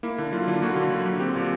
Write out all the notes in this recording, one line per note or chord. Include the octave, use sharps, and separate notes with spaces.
A#3 E4
D3
F#3 F4
D3
A#3 F#4
D3
F#3
D3
C4 G4
A#2